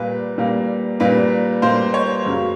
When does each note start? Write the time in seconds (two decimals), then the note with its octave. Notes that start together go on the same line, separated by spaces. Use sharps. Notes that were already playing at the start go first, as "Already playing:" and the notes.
Already playing: A#2 G3 A#3 B4
0.38 A#2 G3 A#3
1.00 A#2 G3 A#3 B4
1.62 A#2 G3 A#3 C5
1.94 C#5
2.25 F#2 C#3 F#3 A#3 C#4